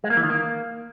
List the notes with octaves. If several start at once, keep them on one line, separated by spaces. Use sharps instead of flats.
G#3
A#3
E3
D#3
A#3